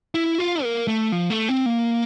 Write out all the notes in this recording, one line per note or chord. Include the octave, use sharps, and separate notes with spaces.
E4
F4
A#3
A3
F3
A3
C4
A#3